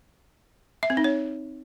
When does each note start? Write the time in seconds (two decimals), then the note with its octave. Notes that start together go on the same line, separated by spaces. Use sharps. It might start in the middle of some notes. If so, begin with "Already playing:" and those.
0.83 E5
0.90 C4
0.97 D#4
1.04 C#5